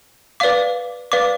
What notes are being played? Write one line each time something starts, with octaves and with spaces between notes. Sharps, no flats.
B4 D5 F5 D6
B4 D5 F5 D6